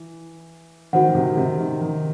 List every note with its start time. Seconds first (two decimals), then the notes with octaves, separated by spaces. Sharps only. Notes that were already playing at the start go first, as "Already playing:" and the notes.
Already playing: E3
0.93 D#3 F#4 C5 F#5
1.09 D#3
1.15 C3
1.30 D#3
1.37 C3
1.59 D#3
1.81 D#3